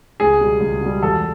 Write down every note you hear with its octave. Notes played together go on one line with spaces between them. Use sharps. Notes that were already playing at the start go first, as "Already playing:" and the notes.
C#2 G#4
B2 G3
C#2
B2 G3
E2 A4